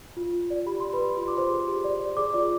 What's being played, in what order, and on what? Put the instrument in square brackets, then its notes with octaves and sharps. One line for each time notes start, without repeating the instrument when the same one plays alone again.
[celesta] F4
F4
D5
G4 B5
D5 C6
B4 B5
G4
F4 C6
D6
F4 C5 C6
G#4
G4
D5
D5
G#4 D5 D6
F4 D5 D6